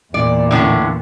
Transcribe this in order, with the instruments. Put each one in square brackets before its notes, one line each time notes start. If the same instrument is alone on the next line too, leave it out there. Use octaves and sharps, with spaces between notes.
[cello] E2 A#2 [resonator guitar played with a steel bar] D5
[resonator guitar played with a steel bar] A2 D3 C#4